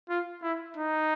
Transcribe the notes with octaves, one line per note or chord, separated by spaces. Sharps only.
F4
E4
D#4